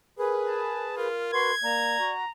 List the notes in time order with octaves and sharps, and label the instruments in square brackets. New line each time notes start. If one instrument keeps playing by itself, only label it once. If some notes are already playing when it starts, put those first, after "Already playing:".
[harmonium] G#4 B4 [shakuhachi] A#4
[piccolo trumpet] A5
[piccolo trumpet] F4 [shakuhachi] A#4
[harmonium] F#4 B4 [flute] C6 [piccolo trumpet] G#6
[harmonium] A#3 [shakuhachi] D5 [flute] A#5
[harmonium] F#4